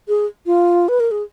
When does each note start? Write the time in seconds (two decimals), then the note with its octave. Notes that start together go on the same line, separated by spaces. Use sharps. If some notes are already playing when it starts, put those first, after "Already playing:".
0.08 G#4
0.46 F4
0.88 B4
1.00 A#4
1.11 G#4